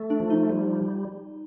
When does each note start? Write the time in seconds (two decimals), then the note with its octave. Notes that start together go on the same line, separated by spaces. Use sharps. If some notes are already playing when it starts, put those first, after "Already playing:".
Already playing: A3
0.10 D4
0.20 F3
0.30 D#4
0.50 G3